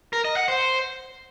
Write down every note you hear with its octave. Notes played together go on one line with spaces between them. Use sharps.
A#4
D#5
F#5
C5